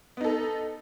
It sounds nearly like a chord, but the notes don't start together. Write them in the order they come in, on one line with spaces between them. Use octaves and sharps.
B3 D#4 A4